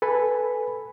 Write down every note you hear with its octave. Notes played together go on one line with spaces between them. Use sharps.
A4 B4 G#5 B5